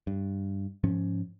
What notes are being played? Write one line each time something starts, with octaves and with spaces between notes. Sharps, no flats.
G2
G#2 F3 C#4